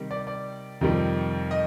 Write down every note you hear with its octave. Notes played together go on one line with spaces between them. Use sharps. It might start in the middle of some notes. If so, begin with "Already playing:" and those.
Already playing: C3 D#3 G3
D5
D5
F2 C3 D#3 G3
D#5